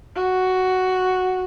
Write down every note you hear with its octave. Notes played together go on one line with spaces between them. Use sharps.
F#4